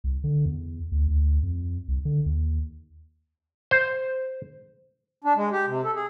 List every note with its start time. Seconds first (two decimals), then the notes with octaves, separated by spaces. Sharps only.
0.04 C2
0.24 D3
0.45 E2
0.92 D2
1.08 D2
1.43 F2
1.88 C2
2.05 D3
2.26 D#2
3.71 C5
5.24 D4
5.36 G#3
5.52 G4
5.67 C3
5.84 A4
5.95 G#4